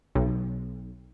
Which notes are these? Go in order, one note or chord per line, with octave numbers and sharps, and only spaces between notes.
B1